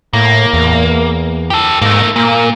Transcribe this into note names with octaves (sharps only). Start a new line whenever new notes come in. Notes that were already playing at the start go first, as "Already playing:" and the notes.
A2 A#3
E2
G4 A4
G#2 A3 A#3
A#2 A#3